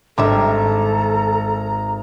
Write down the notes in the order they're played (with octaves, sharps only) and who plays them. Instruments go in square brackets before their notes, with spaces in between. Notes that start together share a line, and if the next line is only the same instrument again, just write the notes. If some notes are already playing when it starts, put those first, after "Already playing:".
[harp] G#1 [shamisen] D4 G4 E5 [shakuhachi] A4 [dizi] A#5